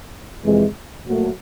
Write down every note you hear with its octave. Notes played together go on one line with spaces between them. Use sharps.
F2 C3 E3 G#3
A#2 F#3 A3